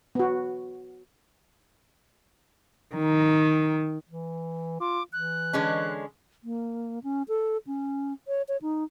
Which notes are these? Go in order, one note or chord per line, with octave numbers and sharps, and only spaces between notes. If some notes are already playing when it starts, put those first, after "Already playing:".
B3 F#4
D#3
E3
F4 D6
E3 F#6
D3 G#3 C#4
A#3
C#4
A4
C#4
C#5
C#5
D#4